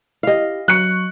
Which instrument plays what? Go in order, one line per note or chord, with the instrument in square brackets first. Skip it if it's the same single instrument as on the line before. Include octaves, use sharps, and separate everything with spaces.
[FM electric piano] E4 G4 [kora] D#5 F5
[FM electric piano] F#3 C#6 [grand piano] F#6 C#7